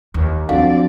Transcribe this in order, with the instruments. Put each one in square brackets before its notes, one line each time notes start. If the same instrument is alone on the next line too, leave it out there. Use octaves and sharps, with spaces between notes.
[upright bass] D#2
[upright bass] F3 [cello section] C4 D5 [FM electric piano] D4 F#4 A4 [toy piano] F5